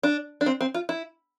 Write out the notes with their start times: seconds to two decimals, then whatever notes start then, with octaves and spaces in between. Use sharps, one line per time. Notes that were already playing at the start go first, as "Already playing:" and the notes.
0.03 D4
0.41 D4
0.46 C4
0.61 C4
0.74 F4
0.89 E4